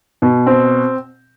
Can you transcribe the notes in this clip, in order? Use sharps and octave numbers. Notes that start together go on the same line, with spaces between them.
B2
C4